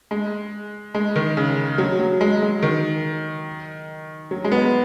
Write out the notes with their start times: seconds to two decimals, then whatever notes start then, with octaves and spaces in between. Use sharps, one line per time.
0.11 G#3
0.94 G#3
1.16 D#3
1.37 C#3
1.78 F#3
2.00 F#3
2.21 G#3
2.42 G#3
2.63 D#3
4.31 F#3
4.44 G#3
4.52 B3